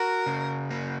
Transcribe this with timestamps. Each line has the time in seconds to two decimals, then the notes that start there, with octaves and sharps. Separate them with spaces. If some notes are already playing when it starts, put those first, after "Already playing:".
Already playing: F#4 A#4
0.26 C#3
0.70 A#3